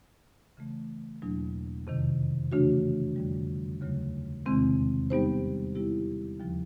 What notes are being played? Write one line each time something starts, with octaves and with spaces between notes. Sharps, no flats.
C#3 E3 A3
E2 B2 F#3 A#3 D4
F2 C3 D#3
C#3 E3 A3 D4 F#4
F2 D3 G3
D#2 C#3 F#3 A3
E2 C3 D#3 G#3 C4
G3 B3 D#4 G4 C5
G3 B3 E4 G4
D#2 C#3 F3